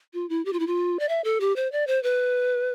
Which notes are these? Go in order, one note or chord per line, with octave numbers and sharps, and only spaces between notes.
F4
E4
G4
F4
E4
F4
D5
E5
A4
G4
C5
D5
C5
B4